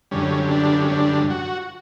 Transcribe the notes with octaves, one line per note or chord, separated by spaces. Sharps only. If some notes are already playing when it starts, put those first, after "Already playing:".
F#2 D3 G3 C#4
D4
C#4
D4
F#4